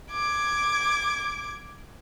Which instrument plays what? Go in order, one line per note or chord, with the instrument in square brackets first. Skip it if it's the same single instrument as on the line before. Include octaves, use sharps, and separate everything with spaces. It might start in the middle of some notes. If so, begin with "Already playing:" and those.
[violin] D6 G#6